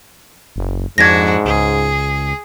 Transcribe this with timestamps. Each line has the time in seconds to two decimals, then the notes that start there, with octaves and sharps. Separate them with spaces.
0.56 F#1
0.98 F2 G#2 D4 F#4 G#6 A#6
1.45 C#2 G#4